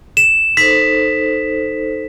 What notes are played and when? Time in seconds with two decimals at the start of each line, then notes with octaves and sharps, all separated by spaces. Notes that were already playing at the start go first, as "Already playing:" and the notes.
0.17 E7
0.57 D#4 A4 C5 B6